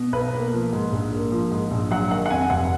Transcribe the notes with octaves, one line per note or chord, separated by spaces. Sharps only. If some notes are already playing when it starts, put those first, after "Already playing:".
Already playing: B2
B1 B4
A#3
F3
G#2
A#1
A#3
F3
G#2
A#1
F#3 F#5
D#3 F#5
F#5
F2 G#5
F1 F#5